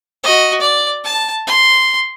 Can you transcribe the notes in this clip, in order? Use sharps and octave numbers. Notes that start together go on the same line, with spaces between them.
F#4 D#5
D5
A5
C6